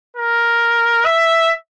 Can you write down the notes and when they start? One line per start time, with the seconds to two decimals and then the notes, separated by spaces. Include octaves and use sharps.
0.16 A#4
1.05 E5